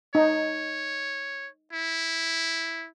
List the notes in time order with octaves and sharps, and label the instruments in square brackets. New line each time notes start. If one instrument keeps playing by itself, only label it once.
[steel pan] D#4 [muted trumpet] C#5
[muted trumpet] E4